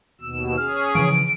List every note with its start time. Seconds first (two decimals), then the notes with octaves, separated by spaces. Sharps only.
0.21 D#2 B2 E6
0.57 C#4 G#4 F6
0.95 C#3 E3 F3 D7